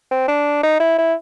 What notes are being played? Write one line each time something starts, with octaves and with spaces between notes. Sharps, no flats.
C4
D4
D#4
E4
E4